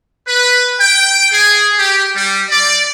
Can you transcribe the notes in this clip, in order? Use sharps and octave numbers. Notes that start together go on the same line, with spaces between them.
B4
G5
G#4
G4
G3
D5